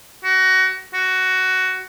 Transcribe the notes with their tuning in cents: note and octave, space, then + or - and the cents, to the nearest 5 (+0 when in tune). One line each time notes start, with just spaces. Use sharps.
F#4 +25
F#4 +10